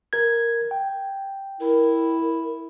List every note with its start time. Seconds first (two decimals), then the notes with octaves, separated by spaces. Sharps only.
0.13 A#4 G#6
0.71 G5
1.60 E4 A#4